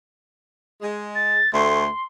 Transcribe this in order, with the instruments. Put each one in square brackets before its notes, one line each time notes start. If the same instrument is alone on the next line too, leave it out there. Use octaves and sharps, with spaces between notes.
[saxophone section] G#3
[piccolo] A6
[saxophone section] D2 A3 [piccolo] C6